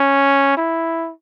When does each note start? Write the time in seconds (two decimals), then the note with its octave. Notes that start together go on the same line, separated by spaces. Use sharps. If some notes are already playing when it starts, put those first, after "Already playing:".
Already playing: C#4
0.57 E4